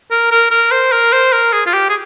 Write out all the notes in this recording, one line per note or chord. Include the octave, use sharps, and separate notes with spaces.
A#4
A#4
A#4
C5
A#4
C5
A#4
G#4
F4
G4
G#4